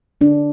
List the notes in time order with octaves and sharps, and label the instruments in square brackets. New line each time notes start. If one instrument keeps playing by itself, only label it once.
[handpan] D3 D4